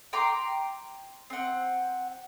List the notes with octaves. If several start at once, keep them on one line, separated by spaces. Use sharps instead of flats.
G5 A#5 C6 D6
C4 F#5